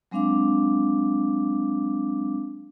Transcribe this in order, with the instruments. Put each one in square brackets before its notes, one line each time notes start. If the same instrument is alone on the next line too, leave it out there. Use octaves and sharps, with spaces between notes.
[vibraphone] F#3 G#3 C4 D4 F5 D6